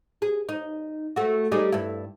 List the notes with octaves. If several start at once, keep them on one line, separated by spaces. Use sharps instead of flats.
G#4
D#4
A3 F#4
G3 D#4 G#4
G2 E4